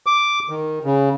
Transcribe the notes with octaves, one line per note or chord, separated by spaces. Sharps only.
D6
D#3
C#3